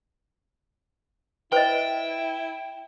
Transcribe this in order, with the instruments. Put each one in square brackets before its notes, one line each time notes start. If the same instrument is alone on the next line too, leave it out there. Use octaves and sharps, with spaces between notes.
[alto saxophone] E4 [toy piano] B4 C5 D#5 [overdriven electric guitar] G5